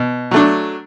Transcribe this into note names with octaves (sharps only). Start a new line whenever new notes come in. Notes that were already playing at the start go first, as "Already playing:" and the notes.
Already playing: B2
F#3 A3 D4